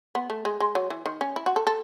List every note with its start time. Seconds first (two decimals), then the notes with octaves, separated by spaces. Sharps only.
0.15 B3
0.30 A3
0.45 G#3
0.60 G#3
0.75 F#3
0.90 E3
1.06 D#3
1.21 C#4
1.36 E4
1.46 F#4
1.56 A4
1.67 A4